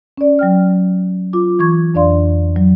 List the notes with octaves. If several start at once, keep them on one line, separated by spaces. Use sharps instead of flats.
C#4 D5
F#3 G5 F6
F4 D6
E3 C#6 G#6
F2 D4 D5 F5 C6
F#3